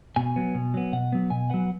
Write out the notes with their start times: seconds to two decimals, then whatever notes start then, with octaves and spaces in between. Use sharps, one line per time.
0.16 B2 G#5
0.36 F#3 B3
0.54 B2
0.74 F#3 B3
0.93 B2 F#5
1.13 F#3 B3
1.30 B2 G#5
1.50 F#3 B3 F#5